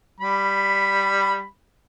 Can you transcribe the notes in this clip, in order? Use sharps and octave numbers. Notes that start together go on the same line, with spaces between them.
G3 B5